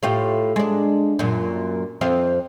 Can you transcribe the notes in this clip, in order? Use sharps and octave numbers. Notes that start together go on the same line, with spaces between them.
A2 F4 G4
G#3 D4
F#2 A#2
F2 C4 F4